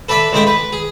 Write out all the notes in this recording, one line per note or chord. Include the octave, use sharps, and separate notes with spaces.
A4 B4 D5 E5 B5
C#2 G#3 A3 E4 G5 D6
B4
G#4